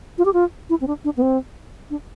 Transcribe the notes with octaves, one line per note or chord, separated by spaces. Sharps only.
F4
G4
F4
E4
C4
D4
D4
B3
C4
D4